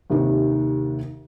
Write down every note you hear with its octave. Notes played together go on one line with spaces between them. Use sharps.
D#2 C3 D#3